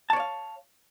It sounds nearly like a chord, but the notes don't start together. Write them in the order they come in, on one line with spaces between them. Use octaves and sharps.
A5 C#5 D5 F5